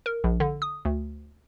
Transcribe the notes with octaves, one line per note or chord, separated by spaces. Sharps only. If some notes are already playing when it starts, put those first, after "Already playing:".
A#4
A#1
D3
D#6
D2